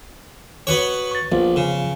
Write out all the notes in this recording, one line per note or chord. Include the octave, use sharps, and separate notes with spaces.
B3 F#4 C#5
C#6 A6
A#1 F3 B3 F4
C#3